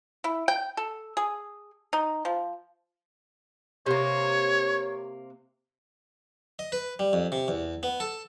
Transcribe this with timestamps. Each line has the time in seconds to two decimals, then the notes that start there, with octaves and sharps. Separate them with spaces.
0.24 E4
0.48 G5
0.77 A4
1.17 G#4
1.93 D#4
2.25 F3
3.86 C3 A#3 C#5
6.59 D#5
6.72 B4
6.99 G3
7.13 F2
7.32 C3
7.48 E2
7.83 B3
8.00 A4